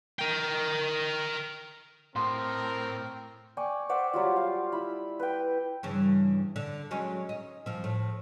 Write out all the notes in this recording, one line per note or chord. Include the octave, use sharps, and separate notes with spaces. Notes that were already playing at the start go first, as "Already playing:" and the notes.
A#4 G5
A2 C4 A#4 C6
D5 G5 G#5 C#6
C5 D5 E5 F#5
F#3 G3 F4
F5
E4 E5 B5
B4 G5
G2 C#3 E3
D3
F#3 G#3 C#4
D#4
F3 C4
A2